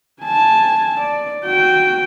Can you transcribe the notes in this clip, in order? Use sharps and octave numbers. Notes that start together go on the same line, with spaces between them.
G#5 A5
D5
F#4 G5